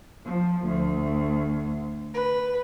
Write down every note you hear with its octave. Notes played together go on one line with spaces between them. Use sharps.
F3
D2
B4